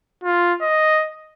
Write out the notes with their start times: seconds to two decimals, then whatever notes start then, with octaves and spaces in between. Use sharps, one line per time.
0.24 F4
0.61 D#5